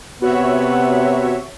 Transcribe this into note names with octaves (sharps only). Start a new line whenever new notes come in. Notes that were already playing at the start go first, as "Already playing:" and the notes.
C3 B3 F#4 C#5 E5